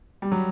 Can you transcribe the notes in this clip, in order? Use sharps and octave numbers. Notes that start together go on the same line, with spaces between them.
G3
F#3